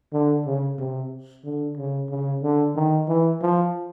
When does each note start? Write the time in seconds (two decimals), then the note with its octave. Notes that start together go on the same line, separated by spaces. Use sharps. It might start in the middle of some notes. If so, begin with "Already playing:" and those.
0.13 D3
0.46 C#3
0.79 C3
1.44 D3
1.77 C#3
2.10 C#3
2.43 D3
2.76 D#3
3.08 E3
3.41 F3